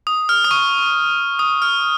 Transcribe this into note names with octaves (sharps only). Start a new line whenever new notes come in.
D#6
F6
D#6
C#6
D#6
F6